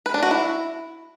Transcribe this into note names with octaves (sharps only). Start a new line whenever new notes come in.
B4
D4
F#4
E4